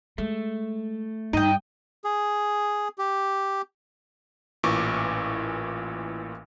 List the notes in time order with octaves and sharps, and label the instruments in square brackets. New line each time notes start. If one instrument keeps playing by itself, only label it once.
[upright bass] G#3 [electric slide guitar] A3
[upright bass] G2 [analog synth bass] D#4 [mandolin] D#5 G5
[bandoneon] G#4
G4
[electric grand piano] A1 A#2 E3 C#6 D6